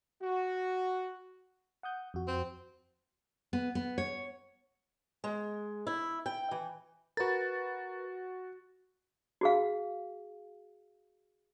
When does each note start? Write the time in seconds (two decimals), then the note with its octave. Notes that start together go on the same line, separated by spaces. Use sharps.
0.22 F#4
1.83 F#5 D#6 G6
2.14 F2 F#4
2.28 C4
3.53 B3
3.75 B3
3.98 C#5
5.24 G#3
5.87 E4
6.26 G5
6.51 E3
7.17 F#4 A#4 B4 A6
9.41 F#4 G#4 F5